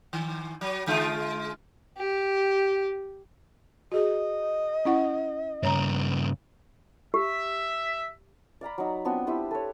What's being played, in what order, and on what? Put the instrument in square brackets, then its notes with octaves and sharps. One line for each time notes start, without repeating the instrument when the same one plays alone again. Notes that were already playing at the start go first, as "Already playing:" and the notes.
[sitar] D#3
F#3
D3 G#3 F4
[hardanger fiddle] G4
[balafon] F#4 G#4 [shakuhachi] D#5
[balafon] C#4 E4 F#5
[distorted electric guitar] G2 C#3 [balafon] C#5 A#5
[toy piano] G4 [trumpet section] E5
[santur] D5 F5 A#5 B5
F#3 D#4
B3 C4 D4 F4
E4 G4 B4 C5
A4 C#5